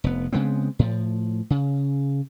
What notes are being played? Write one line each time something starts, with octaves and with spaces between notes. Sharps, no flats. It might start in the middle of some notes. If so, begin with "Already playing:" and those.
F1 B3
C#3 G#3 B3 C4
A2 F3
C#3